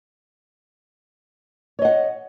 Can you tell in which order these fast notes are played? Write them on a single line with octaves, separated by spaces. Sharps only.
C#5 D#5 F#5